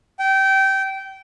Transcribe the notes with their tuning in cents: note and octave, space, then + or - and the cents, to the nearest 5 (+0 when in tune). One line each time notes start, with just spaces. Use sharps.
G5 -20